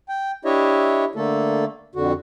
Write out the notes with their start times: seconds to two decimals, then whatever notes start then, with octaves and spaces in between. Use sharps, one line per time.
0.09 G5
0.45 D4 E4 G4 C#5 D#5 E5
1.15 D3 A3 A#3 A4
1.95 F2 D3 F#4